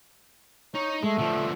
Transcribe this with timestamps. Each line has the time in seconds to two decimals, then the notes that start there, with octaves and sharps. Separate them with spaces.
0.74 D#4 C#5
1.03 G#3 A3
1.18 D3 F3